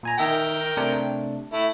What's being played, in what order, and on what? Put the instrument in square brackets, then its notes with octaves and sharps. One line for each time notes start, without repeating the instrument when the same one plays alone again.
[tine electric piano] A#2 G#5 A#5
[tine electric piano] D#3 E5 A#6 [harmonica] A#4 G5
[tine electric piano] C3 A3 D4
[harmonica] A3 E4